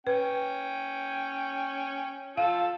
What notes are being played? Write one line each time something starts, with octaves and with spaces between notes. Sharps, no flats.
C#4 B4 G5
F4 F5 A5 E6